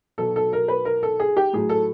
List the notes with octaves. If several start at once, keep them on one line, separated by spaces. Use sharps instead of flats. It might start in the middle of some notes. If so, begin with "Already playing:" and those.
B2 F#3 A4
A4
A#4
B4
A#4
A4
G#4
G4
A2 F#3 G#4
A4